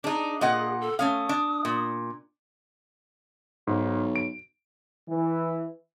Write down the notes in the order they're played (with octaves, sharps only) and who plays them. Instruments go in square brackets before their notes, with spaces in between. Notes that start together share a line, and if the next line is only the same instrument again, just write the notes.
[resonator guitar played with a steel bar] D4 D#4 [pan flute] G#4
[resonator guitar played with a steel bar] A#2 D#5 F#5
[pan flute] A4
[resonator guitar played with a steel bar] A3 C#4 F5 [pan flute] D#6
[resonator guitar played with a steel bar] D4
A#2
[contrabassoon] B1 [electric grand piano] G#2
[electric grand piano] D7
[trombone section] E3